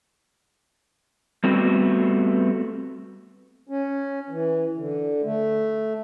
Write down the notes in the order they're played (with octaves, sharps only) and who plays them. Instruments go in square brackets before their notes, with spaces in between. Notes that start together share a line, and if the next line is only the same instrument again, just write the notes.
[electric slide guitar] G3 A3 B3 C4 F#4
[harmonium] C#4
E3
D3
A3